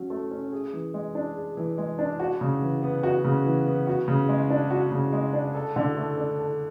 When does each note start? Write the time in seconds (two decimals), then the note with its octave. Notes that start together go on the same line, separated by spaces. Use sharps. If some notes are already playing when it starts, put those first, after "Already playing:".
Already playing: F#3 C#4
0.10 A3
0.31 C#4
0.52 G#4
0.73 E3
0.94 G#3
1.15 D4
1.36 G#4
1.57 E3
1.78 G#3
1.99 D4
2.20 F#4
2.41 C#3
2.62 E3
2.82 B3
3.03 F#4
3.24 C#3
3.46 E3
3.66 B3
3.87 F#4
4.08 C#3
4.29 G#3
4.50 D4
4.71 F#4
4.92 C#3
5.13 G#3
5.33 D4
5.55 A4
5.76 D3
5.97 A3
6.17 D4
6.39 A4